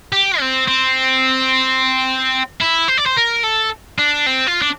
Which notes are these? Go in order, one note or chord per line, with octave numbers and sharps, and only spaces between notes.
G4
C4
C4
E4
C5
D5
C5
A#4
A4
D4
C4
F4
D4